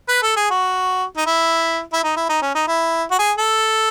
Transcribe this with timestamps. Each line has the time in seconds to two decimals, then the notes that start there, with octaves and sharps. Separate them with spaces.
0.09 B4
0.22 A4
0.36 G#4
0.50 F#4
1.17 D#4
1.26 E4
1.93 E4
2.04 D#4
2.17 E4
2.29 D#4
2.42 C#4
2.55 D#4
2.68 E4
3.11 F#4
3.19 G#4
3.38 A4